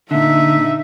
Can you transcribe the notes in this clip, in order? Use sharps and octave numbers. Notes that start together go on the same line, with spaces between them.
A#2 D3 D#4 E5